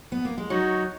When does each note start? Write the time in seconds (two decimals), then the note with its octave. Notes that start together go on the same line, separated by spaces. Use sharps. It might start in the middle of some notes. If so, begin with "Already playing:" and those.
0.12 B3
0.25 A#3
0.38 G#3
0.50 F#3 D#4 F#4 C#5